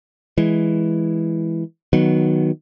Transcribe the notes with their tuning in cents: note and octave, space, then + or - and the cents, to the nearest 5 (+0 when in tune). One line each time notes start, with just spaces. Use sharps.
E3 +0 G#3 +0
D#3 +0 F#3 +0 B3 -15